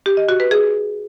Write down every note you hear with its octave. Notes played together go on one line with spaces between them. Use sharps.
G4
D#5
F#4
B4
G#4